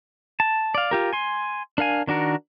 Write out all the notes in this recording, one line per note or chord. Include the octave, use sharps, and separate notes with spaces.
A5
D5 F5
F4 G4 A#4
G#5 C6
D4 A#4 F5 G#5
D#3 D4 F#4 A#4